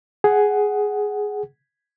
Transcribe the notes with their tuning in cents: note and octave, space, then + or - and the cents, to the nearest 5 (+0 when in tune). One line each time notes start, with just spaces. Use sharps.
G#4 +5 F#5 +10